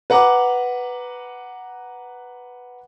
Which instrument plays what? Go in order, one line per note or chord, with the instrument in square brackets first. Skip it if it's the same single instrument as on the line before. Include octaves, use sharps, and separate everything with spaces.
[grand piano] B4 F#5 A#5 D6